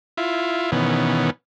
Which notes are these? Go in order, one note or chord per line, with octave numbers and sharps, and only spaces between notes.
E4 F4
B2 D#3 E3 B3 C#4